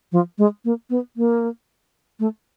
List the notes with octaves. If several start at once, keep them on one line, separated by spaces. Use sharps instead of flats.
F3
G#3
A#3
B3
A#3
A3